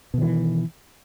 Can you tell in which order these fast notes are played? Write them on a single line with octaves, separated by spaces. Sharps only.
B2 D#3 E3